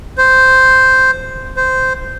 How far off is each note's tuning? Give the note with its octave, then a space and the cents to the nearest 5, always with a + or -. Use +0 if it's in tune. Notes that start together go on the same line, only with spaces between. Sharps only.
C5 -5
C5 -10